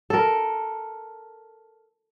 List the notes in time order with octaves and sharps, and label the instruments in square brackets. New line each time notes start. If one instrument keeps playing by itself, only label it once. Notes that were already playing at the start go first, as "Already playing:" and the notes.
[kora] A4 A#4